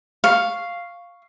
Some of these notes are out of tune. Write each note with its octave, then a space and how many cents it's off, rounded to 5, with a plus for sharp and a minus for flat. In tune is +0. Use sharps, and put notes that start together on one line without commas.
F5 +0 C#6 +0